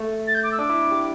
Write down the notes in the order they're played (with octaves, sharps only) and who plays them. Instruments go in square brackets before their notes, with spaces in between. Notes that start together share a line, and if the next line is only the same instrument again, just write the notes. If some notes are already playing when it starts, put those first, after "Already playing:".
Already playing: [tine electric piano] A3
[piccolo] A6
G6
D6
E6
[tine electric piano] D4 [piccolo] D6
[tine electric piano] E4
G4